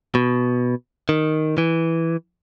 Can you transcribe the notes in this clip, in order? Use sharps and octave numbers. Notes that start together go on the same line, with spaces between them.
B2
D#3
E3